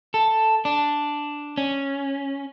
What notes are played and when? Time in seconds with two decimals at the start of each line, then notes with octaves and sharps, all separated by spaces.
0.14 A4
0.65 D4
1.57 C#4